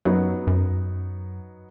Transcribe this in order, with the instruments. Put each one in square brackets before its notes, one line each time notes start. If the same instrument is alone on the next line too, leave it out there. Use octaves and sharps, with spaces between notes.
[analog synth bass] F#2 [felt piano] F#3 B3 D#4
[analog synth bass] F#2